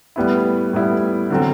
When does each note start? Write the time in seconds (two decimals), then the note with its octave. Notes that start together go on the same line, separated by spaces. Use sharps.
0.16 A2 G3 B3 E4
0.73 A2 G3 B3 E4
1.30 D3 F#3 C4